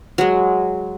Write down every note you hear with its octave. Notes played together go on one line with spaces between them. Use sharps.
F#3 G#3